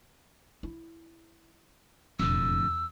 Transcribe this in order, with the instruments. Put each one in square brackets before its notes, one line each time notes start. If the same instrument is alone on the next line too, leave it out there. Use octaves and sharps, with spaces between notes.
[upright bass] E4
[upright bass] E1 [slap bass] F2 A2 D3 [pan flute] E6
[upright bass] E2